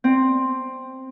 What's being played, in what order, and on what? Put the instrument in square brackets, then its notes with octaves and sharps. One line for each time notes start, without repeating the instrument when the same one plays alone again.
[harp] C4